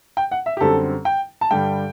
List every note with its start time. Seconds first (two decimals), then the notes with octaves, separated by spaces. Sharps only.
0.17 G5
0.31 F#5
0.46 E5
0.57 G4
0.61 F#2 D3 G3 C4 A4
1.05 G5
1.41 A5
1.51 G2 D3 G3 G5